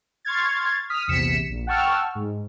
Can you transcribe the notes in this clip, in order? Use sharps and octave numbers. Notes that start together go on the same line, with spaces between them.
C6 C#6 F6 G#6 A6
D#6 F6 B6
A#1 E2 C3 B6 C#7 E7
A#1
F#5 G5 A5 C#6 E6 F6
G#2